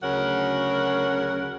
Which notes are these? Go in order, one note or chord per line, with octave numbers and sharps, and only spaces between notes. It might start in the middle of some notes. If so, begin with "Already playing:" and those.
D2 C#3 F#3 A#4 C#5 F#5